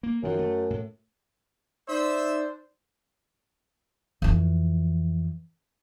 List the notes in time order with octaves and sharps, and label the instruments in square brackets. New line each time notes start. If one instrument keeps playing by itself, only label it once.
[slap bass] A#3
[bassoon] F#2 [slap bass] D#3 F3
[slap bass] A3
A2
[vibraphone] D#4 [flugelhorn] C5 [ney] D5 [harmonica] E5 E6
[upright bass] F2 E3